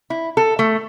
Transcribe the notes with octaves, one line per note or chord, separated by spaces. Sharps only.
E4
A4
A3